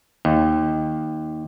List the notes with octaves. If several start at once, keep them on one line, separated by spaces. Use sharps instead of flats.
D#2